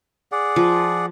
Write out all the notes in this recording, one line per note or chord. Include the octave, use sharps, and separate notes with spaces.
G#4 D5 F#5
F3